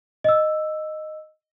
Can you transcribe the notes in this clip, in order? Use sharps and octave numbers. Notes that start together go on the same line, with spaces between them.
D#5 E6